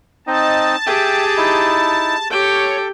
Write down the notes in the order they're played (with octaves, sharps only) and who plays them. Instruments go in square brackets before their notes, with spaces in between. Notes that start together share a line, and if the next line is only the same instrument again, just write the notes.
[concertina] C4 D#4 D#5 [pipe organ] A5
[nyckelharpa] G4 G#4 [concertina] E5 G5
[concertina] D#4 E4
[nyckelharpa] G4 G5 [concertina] A4 [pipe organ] C#5